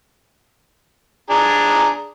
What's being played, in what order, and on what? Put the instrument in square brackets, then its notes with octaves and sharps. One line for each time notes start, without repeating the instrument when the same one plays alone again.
[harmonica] D4 G#4 A#5